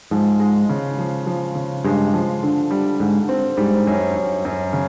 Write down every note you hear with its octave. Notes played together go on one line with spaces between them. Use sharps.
G#2 F3
G#3
C#3
F3
F3
C#3
G2 G#3
F3
D3
G3
G#2 D3
C4
G#2 G3
F#2
F#2
F#2
C#3